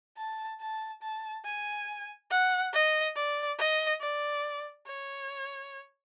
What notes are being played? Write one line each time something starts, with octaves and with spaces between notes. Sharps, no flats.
A5
A5
A5
G#5
F#5
D#5
D5
D#5
D5
C#5